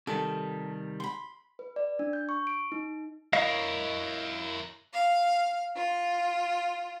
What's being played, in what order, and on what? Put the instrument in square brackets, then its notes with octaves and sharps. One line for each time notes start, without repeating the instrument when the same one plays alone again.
[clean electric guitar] C3 D#3 G3 [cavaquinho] A4
[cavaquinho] B5 C6
[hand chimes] B4
D5
D4
G6
C#6
D7
D#4
[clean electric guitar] E4 D#5 F5 [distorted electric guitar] A#4 C#5
[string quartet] F5
F4